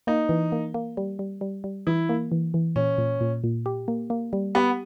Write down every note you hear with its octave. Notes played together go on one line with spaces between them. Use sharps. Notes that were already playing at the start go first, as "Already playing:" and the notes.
A#3 D#4
E3
A#3
A#3
G3
G3
G3
G3
E3 E4
A#3
E3
E3
A#2 C#4
A#2
A#2
A#2
G4
A#3
A#3
G3
B3 G4